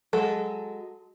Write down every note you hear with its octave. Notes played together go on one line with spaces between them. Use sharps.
F#3 G#3 A4